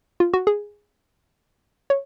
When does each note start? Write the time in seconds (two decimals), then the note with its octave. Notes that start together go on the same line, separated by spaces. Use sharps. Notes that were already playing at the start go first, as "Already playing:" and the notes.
0.20 F4
0.34 F#4
0.47 G#4
1.90 C#5